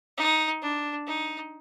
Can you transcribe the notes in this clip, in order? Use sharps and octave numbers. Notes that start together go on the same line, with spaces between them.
D#4
D4
D#4